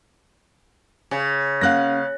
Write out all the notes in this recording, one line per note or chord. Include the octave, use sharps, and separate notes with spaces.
C#3
A#3 C#4 F5 F#5 F#6 A#6